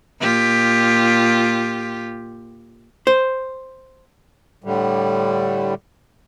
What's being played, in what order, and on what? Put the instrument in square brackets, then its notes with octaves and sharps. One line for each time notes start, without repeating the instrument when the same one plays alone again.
[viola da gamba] A#2 F4 G4
[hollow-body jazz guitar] C5
[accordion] A2 D3 G3